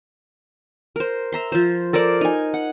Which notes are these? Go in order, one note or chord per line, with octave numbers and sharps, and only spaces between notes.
A#4 C5
E5 A#5 C6
F3 C5
A4 A#4 C5 D5
D#4 G#5
F#5